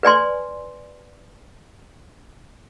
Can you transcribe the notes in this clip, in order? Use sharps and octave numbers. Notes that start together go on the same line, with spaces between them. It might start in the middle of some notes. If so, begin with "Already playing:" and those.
B4 D5 G#5 C6